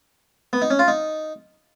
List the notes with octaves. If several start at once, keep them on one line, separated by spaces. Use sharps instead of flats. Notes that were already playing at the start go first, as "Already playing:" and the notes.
B3
D#4
C#4
F4
D#4